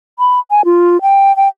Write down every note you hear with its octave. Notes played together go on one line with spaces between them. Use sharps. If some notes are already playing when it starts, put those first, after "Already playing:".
B5
G#5
F4
G5
G5